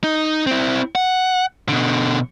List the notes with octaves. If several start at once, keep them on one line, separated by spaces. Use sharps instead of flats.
D#4
C4 E4
F#5
B2 D3